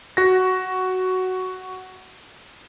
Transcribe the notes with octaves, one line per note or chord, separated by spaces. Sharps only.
F#4 A#6